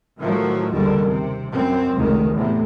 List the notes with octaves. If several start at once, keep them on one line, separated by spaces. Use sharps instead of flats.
A2 D#3 F3 F#3
F#1 D#2 D3 D#3 G3
C3
F#2 C4
F1 C#2 D#3
E2 A2 C3